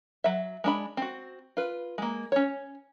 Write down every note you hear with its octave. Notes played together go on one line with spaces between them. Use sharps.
F#3 E5
G#3 D4 B5
C4 F#4
F4 B4
G#3 A#3
C#4 C#5